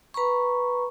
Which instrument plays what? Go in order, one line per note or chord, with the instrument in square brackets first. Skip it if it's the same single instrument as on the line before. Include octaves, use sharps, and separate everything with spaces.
[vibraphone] B4 A#5 B5 C#6